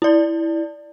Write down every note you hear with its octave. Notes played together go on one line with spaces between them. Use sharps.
E4 D5